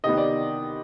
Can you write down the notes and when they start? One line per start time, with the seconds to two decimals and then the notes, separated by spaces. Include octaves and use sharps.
0.04 C3 D#3 B3 D#5
0.17 D5